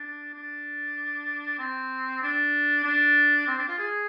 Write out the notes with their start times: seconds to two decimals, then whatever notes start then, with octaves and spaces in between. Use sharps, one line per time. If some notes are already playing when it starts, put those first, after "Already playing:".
Already playing: D4
0.34 D4
1.59 C4
2.22 D4
2.84 D4
3.47 C4
3.58 D4
3.68 F4
3.78 G#4